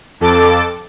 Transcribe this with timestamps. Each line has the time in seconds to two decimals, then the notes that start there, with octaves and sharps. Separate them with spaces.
0.20 F2 A4 D6 A6